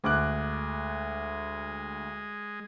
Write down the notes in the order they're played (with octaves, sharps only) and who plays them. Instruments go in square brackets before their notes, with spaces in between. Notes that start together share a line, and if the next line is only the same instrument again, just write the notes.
[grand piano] D2 D6 F#6 [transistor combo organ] G#3